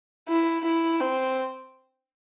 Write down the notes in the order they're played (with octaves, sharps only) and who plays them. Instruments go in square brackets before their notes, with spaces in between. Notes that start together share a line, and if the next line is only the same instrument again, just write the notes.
[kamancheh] E4
E4
C4